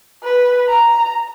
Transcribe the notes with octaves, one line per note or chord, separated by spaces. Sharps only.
B4
A#5